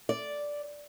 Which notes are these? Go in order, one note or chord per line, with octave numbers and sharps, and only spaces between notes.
D5